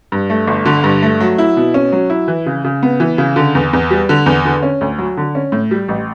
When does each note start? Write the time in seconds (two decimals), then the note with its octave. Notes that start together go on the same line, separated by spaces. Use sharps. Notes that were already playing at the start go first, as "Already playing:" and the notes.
0.12 G2
0.30 A3
0.48 G1
0.66 D3
0.84 G2
1.02 A3
1.20 F#3
1.38 E4
1.57 B2
1.74 C#4
1.92 F#3
2.10 E4
2.28 E3
2.46 C#3
2.64 C#3
2.83 B3
3.00 E3
3.18 C#3
3.36 D3
3.55 E2
3.73 E2
3.91 G3
4.09 D3
4.26 E2
4.45 D3
4.62 C#4
4.81 D2
4.98 F#3
5.17 D3
5.35 C#4
5.52 A2
5.71 G3
5.88 A1